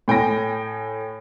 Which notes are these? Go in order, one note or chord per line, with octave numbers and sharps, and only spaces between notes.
A2 G5 G#5 A#6